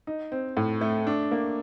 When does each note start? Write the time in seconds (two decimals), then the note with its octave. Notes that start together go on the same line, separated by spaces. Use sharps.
0.07 D#4
0.32 C4
0.57 A2
0.81 A3
1.07 D4
1.32 A#3